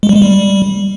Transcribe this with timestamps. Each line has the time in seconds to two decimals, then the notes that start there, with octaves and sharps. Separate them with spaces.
0.03 G#3
0.09 G3
0.16 G#3
0.22 G3